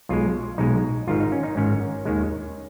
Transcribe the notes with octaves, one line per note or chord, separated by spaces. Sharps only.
B1 B2 G#3 F4
B1 B2 G#3 D#4
G#1 G#2 D#3 F4
D#4
C#4
D#4
G#1 G#2 D#3 C#4
D#2 D#3 G#3